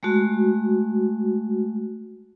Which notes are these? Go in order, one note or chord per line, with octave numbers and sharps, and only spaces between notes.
G#3 A3 F#4